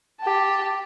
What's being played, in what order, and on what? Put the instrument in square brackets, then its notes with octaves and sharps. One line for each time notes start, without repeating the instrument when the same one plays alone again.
[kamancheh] G4 A5